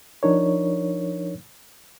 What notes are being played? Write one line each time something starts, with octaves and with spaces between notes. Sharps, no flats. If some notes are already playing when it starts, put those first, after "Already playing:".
F3 D4 D#4 A#4 C#5